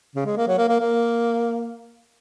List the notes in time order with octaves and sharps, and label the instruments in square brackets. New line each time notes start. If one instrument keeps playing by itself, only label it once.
[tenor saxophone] C#3
G#3
A#3
F#3
A#3
A#3
A#3